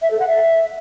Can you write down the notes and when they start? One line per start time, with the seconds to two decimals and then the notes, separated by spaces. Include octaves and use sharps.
0.01 E5
0.10 A4
0.19 F#5
0.28 E5